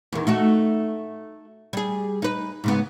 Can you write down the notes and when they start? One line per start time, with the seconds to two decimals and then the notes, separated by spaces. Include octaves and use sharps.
0.12 E2 D#3
0.27 A3 D#4 F#4
1.73 G3 G#4
2.22 D#4 B4
2.64 G#2 C#3 B3